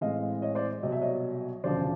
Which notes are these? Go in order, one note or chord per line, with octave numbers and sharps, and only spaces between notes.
A2 E3 G#3 C4 D#5 F5
C#5 D#5
C5 D5
C2 B2 F#3 D#5
E5
C#5 D#5
E1 D2 C#3 F3 C5 D5